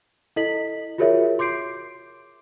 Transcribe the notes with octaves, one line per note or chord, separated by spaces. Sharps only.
E4 A4 D#5 B6 F#7
F4 F#4 G#4 A#4 C#5 E5
C6 D6 G6 C7 D7